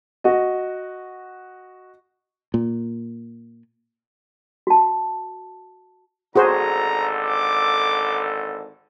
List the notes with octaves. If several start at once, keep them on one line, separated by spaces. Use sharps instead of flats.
F#4 D#5
A#2
F#4 A5
G#1 D3 F#4 G#4 A4 C5 A#5
D6